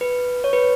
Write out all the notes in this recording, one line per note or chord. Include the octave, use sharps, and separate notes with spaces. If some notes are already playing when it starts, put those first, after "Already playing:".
B4
C#5
B4